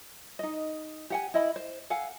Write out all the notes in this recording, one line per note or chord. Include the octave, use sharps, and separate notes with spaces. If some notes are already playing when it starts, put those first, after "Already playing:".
D#4 D#5
G4 F#5 G#5
E4 D#5 B5
C5
A4 F5 F#5 G#5